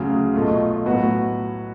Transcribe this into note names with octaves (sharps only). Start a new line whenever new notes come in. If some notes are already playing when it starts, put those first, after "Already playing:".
Already playing: D2 C#3 F#3
B1 B2 A3 F4
A2 F#3 B3 F#4 B4